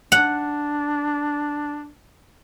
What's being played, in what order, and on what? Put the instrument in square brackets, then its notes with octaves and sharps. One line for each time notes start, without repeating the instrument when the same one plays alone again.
[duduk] D4 [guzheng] F#5